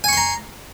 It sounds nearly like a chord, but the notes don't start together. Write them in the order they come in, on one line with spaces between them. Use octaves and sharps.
G#5 C#6 C6 A#5